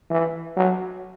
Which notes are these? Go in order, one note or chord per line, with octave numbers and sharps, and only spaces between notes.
E3
F#3